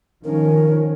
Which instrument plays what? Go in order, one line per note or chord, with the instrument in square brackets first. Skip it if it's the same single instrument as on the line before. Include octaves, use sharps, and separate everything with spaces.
[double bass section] D#3 F3 C#4 [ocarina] A#4